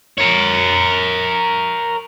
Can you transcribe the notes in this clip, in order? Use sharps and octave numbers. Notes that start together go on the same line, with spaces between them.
A#4 C#5